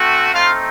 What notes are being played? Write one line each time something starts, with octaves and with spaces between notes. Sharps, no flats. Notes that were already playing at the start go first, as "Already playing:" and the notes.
Already playing: A3 C4 F#4
A3 C4 D#4 F4 F5